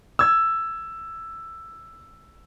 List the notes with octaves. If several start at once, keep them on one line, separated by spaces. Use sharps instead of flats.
E6 G#6